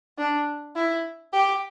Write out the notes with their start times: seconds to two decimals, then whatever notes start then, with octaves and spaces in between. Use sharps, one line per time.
0.18 D4
0.75 E4
1.33 G4